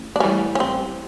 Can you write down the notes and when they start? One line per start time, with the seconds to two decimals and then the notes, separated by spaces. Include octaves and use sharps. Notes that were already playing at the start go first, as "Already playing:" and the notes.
Already playing: A1
0.16 D4
0.20 A2 E3 G3 C#4
0.55 C#4
0.60 A1 C4